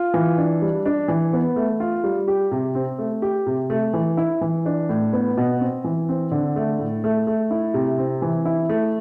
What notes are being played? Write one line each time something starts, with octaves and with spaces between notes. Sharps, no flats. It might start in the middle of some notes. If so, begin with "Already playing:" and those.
Already playing: F4
E3
D4
G3
D4
E3
B3
A3
F4
G3
G4
C3
C4
A3
G4
C3
A3
E3
E4
E3
D4
A2
B3
B2
C4
E3
C4
D3
A3
A2
A3
A3
E4
C3
C4
E3
E4
A3